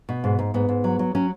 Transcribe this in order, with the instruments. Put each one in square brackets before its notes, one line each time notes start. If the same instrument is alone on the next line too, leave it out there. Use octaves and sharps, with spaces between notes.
[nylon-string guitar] B2
G#2
G#2
G#2 B3
G#2
F#3
F#3
F#3 C#4